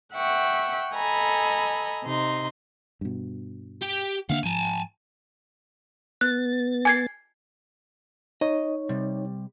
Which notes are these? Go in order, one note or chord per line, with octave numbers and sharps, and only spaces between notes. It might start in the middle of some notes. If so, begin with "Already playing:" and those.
E5 F#5 G5 C#6
A4 D#5 G#5 A#5 B5
C3 D#4 C6
G2 B2
G4 G5
D3 A#3 D4 F5 F#5
G#2 F3 G#5 A5
B3 F#6 A6
G#5 G#6 C7
D#4 C#5 D#5
C3 G3